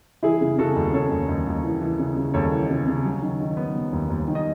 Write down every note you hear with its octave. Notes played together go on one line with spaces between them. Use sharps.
E3 E4 G#4
C#3
C#3 F#4 A4
D#2
C#3 A4 C#5
D#2
D#2
D#2
E3
E3
C#3
C#3
D#2 A4 C#5
E3
C#3
C#3
F#3
D#3
D#3
B3
F#3
D#2
D#2
D#3
D#5